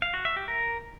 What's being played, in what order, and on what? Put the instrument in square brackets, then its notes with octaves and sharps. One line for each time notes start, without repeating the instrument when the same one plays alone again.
[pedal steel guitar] F5
F#4
E5
G4
A#4